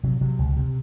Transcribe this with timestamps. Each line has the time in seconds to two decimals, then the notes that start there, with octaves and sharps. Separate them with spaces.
0.03 C3 F#3
0.21 C3 F#3
0.39 C#2
0.57 C3